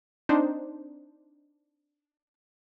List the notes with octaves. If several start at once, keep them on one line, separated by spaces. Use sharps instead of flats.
C4 D4 D#4 C5